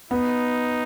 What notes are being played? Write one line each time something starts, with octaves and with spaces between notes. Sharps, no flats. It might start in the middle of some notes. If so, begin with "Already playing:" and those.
B3 D#4